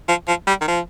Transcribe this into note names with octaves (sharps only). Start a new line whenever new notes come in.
F3
F3
G3
D#3
F3